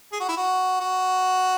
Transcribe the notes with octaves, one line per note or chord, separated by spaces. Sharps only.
G#4
F#4
E4
F#4
F#4